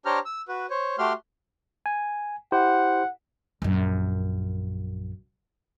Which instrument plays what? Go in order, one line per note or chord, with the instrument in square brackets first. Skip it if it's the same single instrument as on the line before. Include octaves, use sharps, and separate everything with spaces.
[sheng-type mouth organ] D4 G4 C5 C#5 A#5 F6
E6
F#4 B4
C5 C#5
A3 F#4 G4 C6 F6
[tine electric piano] G#5
[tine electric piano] E4 G4 C5 [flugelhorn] F#5
[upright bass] A#1 F#2